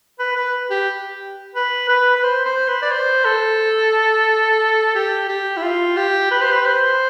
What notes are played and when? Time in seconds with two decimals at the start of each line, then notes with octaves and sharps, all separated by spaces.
0.19 B4
0.36 B4
0.70 G4
1.55 B4
1.89 B4
2.15 B4
2.23 C5
2.45 C5
2.68 B4
2.82 D5
2.91 C5
3.25 A4
4.95 G4
5.29 G4
5.57 E4
5.63 F4
5.97 G4
6.31 B4
6.41 C5
6.51 B4
6.65 C5